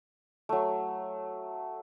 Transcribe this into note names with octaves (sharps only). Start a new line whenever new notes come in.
F#3 A3